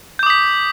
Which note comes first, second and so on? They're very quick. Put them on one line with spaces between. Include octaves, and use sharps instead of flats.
G6 D6 D#6 B6